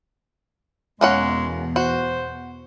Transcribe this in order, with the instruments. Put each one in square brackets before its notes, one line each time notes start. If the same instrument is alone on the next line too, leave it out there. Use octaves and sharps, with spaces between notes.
[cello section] E2 B2 [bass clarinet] G#3 [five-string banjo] A#3 C#4 F#5
[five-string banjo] F#4 [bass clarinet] C5